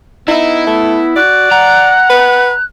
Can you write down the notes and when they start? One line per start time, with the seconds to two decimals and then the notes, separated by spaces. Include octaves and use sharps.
0.28 B3 D#4 E4 E5
0.67 A3
1.16 F#4 D5 F#6
1.52 F#5 A#5
2.10 B4